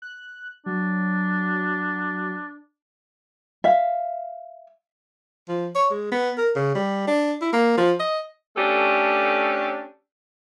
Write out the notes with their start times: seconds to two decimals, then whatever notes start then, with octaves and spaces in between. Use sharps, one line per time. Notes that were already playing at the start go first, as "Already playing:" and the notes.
0.02 F#6
0.66 F#3 D4
3.64 E5 F5
5.49 F3
5.75 C#5
5.91 G#3
6.12 B3
6.38 A#4
6.56 C#3
6.75 G3
7.07 D4
7.41 E4
7.53 A#3
7.77 F3
8.00 D#5
8.57 A3 C#4 D4 G4 A4